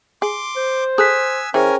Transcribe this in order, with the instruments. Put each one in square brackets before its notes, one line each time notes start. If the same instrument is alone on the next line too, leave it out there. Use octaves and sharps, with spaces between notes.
[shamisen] G#4 [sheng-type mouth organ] C6 D6
[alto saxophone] C5
[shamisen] G#4 A4 [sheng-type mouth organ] G#5 E6 [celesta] D#6 F#6 B6
[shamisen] E3 [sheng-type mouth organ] C#4 A#4 G#5 [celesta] G#4 C5 G5